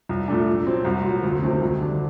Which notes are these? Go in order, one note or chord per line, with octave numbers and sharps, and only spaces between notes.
C2
A#2 A3 D4
A#2
F#3 C4
C2 F#4
A#2 F#3
D2
C3 D#3 A3 C4
D2
D3 G3 D4